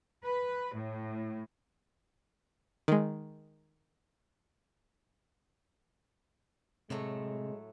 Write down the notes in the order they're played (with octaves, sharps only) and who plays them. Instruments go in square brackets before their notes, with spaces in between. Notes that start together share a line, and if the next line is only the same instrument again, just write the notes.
[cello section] B4
A2
[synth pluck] D#3 G#3
[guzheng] A2 F#3 A3 [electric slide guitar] C3 [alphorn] G#3